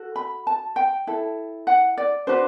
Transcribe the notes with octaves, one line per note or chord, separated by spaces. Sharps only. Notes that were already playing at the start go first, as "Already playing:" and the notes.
Already playing: F#4 A4
B5
A5
G5
E4 A4
F#5
D5
D4 F#4 B4 C5